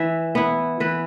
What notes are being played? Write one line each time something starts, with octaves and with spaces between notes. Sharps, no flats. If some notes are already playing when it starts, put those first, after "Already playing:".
Already playing: E3 E5
B3 E4
E3 B4